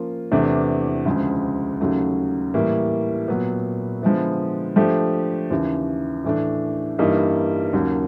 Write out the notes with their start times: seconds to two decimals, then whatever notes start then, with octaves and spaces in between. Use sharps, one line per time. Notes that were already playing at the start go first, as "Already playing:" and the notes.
Already playing: F3 A#3 C#4 F4
0.32 E2 C3 E3 A3 D4
1.05 D2 C#3 F3 G#3
1.80 D#2 C#3 F#3 A3
2.54 A2 E3 G3 A#3
3.28 A#2 F#3 B3
4.02 D3 F3 G#3 B3 E4
4.76 F3 A3 D4 G4
5.50 D#2 C#3 E3
6.24 A2 E3 A3 D4
6.98 G2 E3 G3 A#3 D#4
7.73 D#2 C#3 F#3 A#3